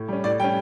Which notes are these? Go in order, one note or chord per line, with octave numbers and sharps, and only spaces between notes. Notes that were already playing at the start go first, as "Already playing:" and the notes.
Already playing: A2
G3 C#4
A2 D5
G3 C#4 G5